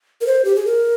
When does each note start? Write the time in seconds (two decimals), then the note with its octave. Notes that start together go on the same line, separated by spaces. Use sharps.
0.21 A#4
0.27 C5
0.45 G4
0.56 G#4
0.66 A#4